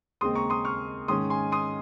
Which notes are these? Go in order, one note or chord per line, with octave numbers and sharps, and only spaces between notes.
D#2 C#3 G#3 C4 C6 D#6
A#5 C#6
C6 D#6
C#6 F6
G#2 D#3 G#3 C#4 C6 D#6
G#5 C6
C6 D#6